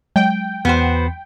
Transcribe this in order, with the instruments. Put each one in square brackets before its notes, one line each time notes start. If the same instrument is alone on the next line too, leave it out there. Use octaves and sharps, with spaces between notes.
[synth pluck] F#3 G#3 [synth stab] G5
[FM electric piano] E2 [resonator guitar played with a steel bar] B3 F#4 C5